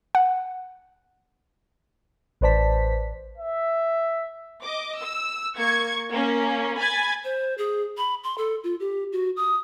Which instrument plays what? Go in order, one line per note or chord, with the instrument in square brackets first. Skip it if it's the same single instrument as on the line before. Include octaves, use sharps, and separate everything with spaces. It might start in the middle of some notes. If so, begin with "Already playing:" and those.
[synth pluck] F#5
[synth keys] A1 B4 C5 D5 A5 B6
[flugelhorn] E5
[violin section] D#5 D6
E6
A#3 C#6 G#6
A#3 C#4
G#5 B5 G#6 A6
[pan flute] C5
G#4
B5
C6
A4
F4
G4
F#4
D#6